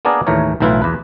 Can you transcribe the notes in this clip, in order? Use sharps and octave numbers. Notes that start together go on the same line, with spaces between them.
A#3 B3 D4 G#4 A#4 D5
D#2 A2 E3 A3 A#4 C#5
B1 A2 E3 E4 F4 B4
E2 B4